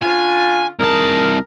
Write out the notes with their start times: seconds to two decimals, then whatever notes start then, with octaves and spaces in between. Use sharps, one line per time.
0.02 D3 C#4 F4 G#5
0.80 C2 D#4 G#4 A#4 A5